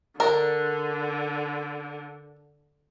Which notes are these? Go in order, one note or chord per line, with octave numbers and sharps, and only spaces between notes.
D3 D4 A#4